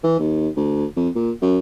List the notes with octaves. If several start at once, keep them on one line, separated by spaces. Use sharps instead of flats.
E3
D#2
D2
F2
A#2
F#2